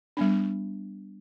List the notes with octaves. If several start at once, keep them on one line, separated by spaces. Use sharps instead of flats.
G3 B3 D4